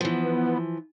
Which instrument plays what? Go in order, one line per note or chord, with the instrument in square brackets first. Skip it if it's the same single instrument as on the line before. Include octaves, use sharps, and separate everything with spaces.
[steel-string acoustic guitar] E3 F3 [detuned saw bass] B3